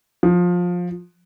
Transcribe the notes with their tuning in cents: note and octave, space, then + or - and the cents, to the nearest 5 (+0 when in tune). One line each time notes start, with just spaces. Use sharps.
F3 +20